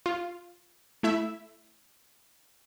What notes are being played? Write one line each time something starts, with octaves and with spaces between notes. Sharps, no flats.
F4
A3 E4 E5